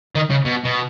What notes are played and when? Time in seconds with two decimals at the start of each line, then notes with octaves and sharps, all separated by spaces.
0.15 D#3
0.30 C#3
0.45 B2
0.64 B2